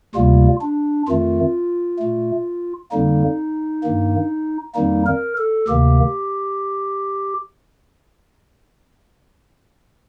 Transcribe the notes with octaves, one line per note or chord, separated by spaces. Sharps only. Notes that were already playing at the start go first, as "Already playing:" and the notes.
D2 C3 G3 A#3 F4
D4
F2 D#3 A3 F4
A#2 A3
F2 D3 G3 A#3 D#4
G2 D#3 A#3
F2 D#3 G3 A#3 D#4
A#4
A4
D2 C3 D#3 A#3 G4